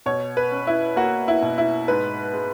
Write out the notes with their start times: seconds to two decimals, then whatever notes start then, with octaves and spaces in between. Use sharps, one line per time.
0.06 B2 C#5
0.37 B4
0.52 C#4
0.67 E4
0.96 A#3 F#4
1.28 E4
1.42 B2
1.58 E4
1.88 G#2 B4
2.33 G#3